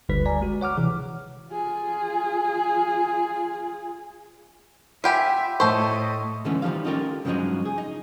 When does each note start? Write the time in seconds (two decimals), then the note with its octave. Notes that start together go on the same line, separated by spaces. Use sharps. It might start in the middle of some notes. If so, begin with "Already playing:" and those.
0.09 G1 D2 D3 G3 B4 B6
0.26 D5 G#5 A#5
0.42 G#3 F#4
0.61 C#5 F#5 D6 F6
0.77 C3 E3 G#4
1.51 F4 G#4
5.04 F4 G4 E5 F#5 G#5 B5
5.60 A2 A4 C5 D#5 C#6
6.45 D3 E3 G#3 A3 B3 C#4
6.62 D#3 F3 G3 D#4 F5
6.84 C#4 D#4 F4 G4 A4 A#4
7.25 G2 C#3 F3 F#3 G#3 D#4
7.65 G#4
7.78 D#4